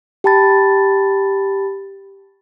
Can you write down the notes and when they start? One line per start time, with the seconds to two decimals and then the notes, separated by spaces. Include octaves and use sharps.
0.24 G4 G5 A5 B5 A6